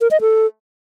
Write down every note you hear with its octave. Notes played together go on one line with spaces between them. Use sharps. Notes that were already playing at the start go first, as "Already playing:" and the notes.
A#4
D#5
A4